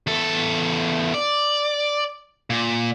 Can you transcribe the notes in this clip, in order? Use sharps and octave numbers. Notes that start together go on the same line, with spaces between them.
E2 A4
D5
A#2